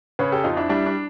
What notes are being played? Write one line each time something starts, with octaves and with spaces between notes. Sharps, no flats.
C#3 B4 C#5
G4 A4
F2 D#4 F4
D4 E4
G3 D4 E4
D4